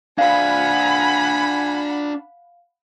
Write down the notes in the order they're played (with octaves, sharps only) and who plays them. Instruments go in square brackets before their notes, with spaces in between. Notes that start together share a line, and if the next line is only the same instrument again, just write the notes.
[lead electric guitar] D4 C5 [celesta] F5 [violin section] F#5 B5 [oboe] G#5